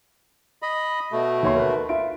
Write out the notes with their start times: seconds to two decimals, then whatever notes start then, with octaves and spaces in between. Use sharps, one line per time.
0.62 D#5 B5
1.12 B2 A3
1.43 D#2 C#5 C6
1.56 A#4 B4
1.89 F4 E5 D7